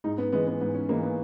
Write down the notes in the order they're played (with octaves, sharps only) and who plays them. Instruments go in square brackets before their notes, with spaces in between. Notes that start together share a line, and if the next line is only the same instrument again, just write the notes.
[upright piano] G#2 D#4
B3
E3 G#3 B3
B3
G#2 B3
C#4
E3 G#3 A#3
B3